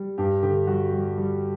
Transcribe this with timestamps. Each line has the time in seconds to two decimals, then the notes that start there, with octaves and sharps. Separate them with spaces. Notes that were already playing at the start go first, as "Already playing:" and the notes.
Already playing: G3
0.18 G2 G4
0.43 D3 G4
0.67 G3 F#4
0.93 G3
1.18 G3